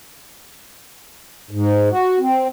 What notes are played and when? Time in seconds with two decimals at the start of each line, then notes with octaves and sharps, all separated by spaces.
1.51 G#2
1.91 F#4
2.19 C4